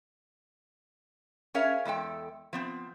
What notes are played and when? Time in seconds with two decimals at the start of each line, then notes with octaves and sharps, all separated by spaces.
1.54 C#4 G#4 A#4 C#5 E5 F5
1.85 E2 G#3 A4 G5
2.53 F3 B3 C4